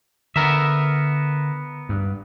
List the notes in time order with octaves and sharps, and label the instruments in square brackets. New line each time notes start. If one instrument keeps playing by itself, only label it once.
[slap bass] D3 [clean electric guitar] B3 A#4 E5
[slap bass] G2